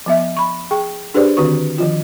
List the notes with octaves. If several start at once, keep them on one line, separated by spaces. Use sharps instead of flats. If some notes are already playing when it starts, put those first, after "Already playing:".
F3 B3 E5
B5 C#6
G#4 G5 C#6
D4 G4 G#4 B4 C5 D5
D3 D#3 C4 F#4 B4 C#6
D#3 F3 F4